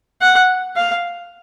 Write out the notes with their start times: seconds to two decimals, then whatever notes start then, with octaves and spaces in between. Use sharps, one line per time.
0.21 F#5
0.77 F5